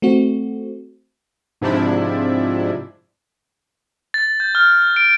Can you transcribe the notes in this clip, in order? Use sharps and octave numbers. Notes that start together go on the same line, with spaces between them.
A3 C4 F#4
G#2 C3 F3 D4 E4
A6
G6
F6
D7